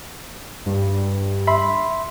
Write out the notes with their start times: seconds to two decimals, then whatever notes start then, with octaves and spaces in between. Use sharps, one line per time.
0.66 G2
1.47 E5 B5 C6